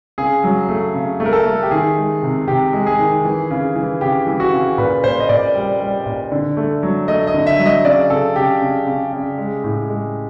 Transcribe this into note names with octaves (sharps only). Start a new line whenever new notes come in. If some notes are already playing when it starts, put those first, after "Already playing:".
C#3 G#4
F#3
A3
C#3
A3
A#4
A4
A3
G4
D#3 G#4
G#3
C3
C3 G4
G#3
G#4
D#3
E3
C#3
E3
C#3 G4
E3
F#4
C#3
A#2 B4
A#2 C5
D#5
A#2 D5
G3
G3
A#2
D3
A3
F#3
A3 D#5
D#5
D3
E5
F#3
D#5
C#3 D5
C#3 A4
C#3 G4
C#3
C#3
C#3
G#3
A2
G#3